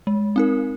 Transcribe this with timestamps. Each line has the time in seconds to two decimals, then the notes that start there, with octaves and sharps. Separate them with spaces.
0.07 G#3
0.36 C4 D#4 A#4